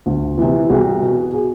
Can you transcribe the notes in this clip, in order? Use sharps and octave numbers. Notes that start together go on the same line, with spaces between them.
D2
C3 E3
C2 F#4 G#4
B2
F#4 G#4